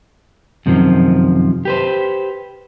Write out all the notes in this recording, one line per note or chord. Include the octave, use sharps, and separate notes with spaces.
F#2 C3 D#3 F3
G4 B4 C5